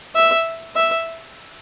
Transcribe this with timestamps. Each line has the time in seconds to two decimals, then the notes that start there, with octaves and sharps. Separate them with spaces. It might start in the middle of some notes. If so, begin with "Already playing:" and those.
0.15 E5
0.75 E5